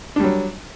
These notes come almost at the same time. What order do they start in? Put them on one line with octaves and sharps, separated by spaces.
D4 G3 F#3